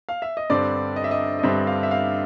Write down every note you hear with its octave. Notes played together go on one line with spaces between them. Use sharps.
F5
E5
D#5
G2 D3 G3 C4 D5
D#5
E5
D#5
D#5
G2 D3 G3 C4 E5
F5
E5
F5